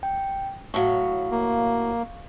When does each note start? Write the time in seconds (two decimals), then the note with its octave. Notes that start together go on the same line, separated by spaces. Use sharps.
0.03 G5
0.74 A2 F#3 F5 C#6
1.31 A#3